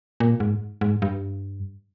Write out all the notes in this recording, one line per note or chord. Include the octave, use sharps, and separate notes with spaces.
A#2
G#2
G#2
G2